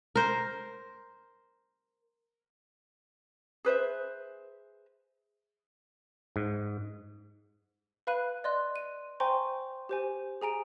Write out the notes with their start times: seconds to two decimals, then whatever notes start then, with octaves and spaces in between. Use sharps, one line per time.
0.16 A#4 C5
3.65 G#4 B4 C5 E5
6.36 G#2
8.07 B4 F5 B5 F#6 D#7
8.44 D5 D#5 C6 F#6
8.76 D#7
9.20 C5 G5 G#5 A#5 C6 C#6
9.89 G4 C5 G#5
10.42 G#4 G#5 A#5 D7